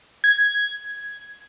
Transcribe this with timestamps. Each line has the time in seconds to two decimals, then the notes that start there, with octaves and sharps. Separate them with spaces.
0.24 G#6